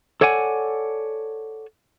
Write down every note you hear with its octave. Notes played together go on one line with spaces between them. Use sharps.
A4 C#5 D5 F#5 G#5